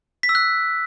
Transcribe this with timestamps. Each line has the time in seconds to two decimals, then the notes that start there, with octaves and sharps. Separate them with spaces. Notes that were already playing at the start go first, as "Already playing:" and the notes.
0.23 B6
0.29 E6
0.35 F#6